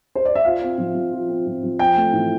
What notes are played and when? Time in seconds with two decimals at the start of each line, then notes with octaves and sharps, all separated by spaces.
0.15 C5
0.25 D5
0.35 E5
0.45 F4 F5
0.61 C4
0.78 F3
0.95 F3
1.12 F4
1.29 C4
1.46 F3
1.63 F3
1.79 C4 G5
1.96 A3
2.13 E3